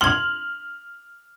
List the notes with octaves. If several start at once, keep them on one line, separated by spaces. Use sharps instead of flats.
C6 F6 G#6 F#7